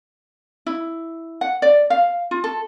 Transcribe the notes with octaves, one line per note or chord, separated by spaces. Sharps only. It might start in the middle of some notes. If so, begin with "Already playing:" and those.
E4
F#5
D5
F5
F4
A4